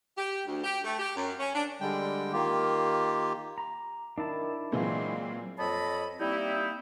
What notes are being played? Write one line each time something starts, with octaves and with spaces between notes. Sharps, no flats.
G4
D2
G4
A3
G4
F#2
C#4
D4
D3 G3 G#3 G5
D#3 A#3 F4 G4
A#5
D#3 D4 E4 A5
A#2 E3 F#3 G#3 C4 F4
F2 C4 C#5 D#5 A5 B5
G3 A#3 C4 D#4 E4